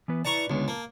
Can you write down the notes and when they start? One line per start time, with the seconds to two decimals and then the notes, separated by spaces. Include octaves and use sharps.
0.08 E3 B3 B4
0.25 E4 B4 D5 A5 A#5 C#6
0.50 C#2 D3 G#3 B3
0.68 A#3 A5